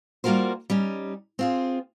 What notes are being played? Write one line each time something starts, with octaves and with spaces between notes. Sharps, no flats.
G3 A#3 F4 F#4 A#4 C5
G3 C#4 D#4
C4 F4 G#4